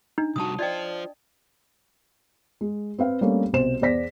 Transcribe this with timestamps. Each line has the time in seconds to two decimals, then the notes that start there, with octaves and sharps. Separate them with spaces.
0.18 D4 D#4
0.36 C3 G3 F#4 A5 D#6
0.59 F4 C5 D5 D#5 G5
2.61 G#3
2.98 C4 B4 F5
3.21 G3 A3 A#3 C4 C#4
3.53 C2 B2 C5 E7
3.81 E2 B3 C5 D5 A#6 B6